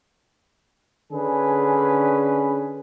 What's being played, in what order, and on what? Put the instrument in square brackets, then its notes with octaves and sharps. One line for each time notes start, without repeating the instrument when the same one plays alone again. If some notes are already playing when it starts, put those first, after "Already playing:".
[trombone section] D3 C#4 G#4 B4